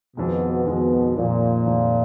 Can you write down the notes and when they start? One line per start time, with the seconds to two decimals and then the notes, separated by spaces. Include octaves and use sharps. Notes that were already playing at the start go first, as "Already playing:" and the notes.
0.17 F2 B2 D#3 G#3
0.67 F2 D#3 G#3
1.16 F2 A#2 D#3 G#3
1.66 F2 D#3 G#3